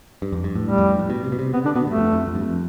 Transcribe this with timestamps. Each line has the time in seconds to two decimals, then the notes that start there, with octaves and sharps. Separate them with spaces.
0.22 G2
0.32 F2
0.44 G2
0.55 A2
0.66 G3
0.78 F2
0.88 G2
0.99 A2
1.10 B2
1.24 C3
1.32 B2
1.39 C3
1.53 C3 B3
1.64 D3 D4
1.75 B2 B3
1.86 G2 A3
1.98 F2
2.12 F2
2.27 F2
2.35 G2
2.41 F2